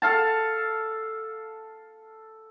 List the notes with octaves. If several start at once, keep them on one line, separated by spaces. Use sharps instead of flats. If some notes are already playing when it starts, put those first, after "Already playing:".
A4 F5 A5